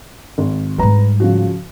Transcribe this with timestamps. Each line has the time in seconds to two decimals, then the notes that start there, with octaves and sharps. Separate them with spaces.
0.38 G#1
0.78 G#2 G3 B4 A#5
1.20 C#3 F3 F#4